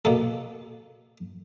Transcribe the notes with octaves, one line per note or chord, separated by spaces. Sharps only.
B2 A#3 A4